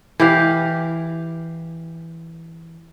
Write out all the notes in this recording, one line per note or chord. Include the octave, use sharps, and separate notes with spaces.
E3 G4 F5